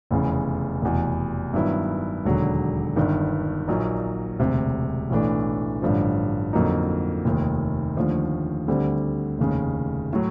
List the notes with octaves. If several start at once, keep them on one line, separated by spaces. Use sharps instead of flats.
F1 E2 C#3
F1 E2 B2
G2 D#3 F#3 B3 E4
E1 D#2 D3 F#3
G1 G2 D#3
A#1 A#2 F#3 A#3 D#4
E1 D2 C3
B1 A2 E3 A3 D4
A1 G2 D3 F3
F2 D3 F#3 A#3 D#4
F1 D#2 D#3
D#2 D3 F3 A3
D2 D3 G3 C4
F1 D#2 C#3
A2 F#3